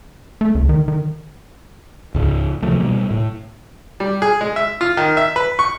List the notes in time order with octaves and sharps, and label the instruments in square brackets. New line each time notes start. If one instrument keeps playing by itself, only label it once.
[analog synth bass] A3
C#2
D#3
D#3
[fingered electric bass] C#2 G#2 C#3
C3 E3 F3 A3
B2 G3 A#3
A2
[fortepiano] G3
G#4
G#3
E5
F4
D#3
E5
B4
C#6